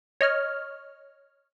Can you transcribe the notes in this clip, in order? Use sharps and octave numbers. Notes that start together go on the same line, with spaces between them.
C#5 D#5 F6